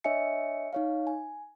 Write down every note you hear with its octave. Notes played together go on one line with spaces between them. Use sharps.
D4 C#5 D#5 E5 G#5 C#7
D#4 C#5 F5
G#5